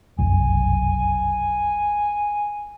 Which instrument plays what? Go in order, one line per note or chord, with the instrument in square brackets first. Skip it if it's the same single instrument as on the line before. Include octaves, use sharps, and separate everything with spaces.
[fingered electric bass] F1 B1 F#2 [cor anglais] G#5